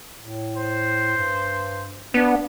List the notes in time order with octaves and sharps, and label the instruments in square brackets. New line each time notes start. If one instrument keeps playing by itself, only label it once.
[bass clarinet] A2
[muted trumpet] C5
[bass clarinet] G2
[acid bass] B3 [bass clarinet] D4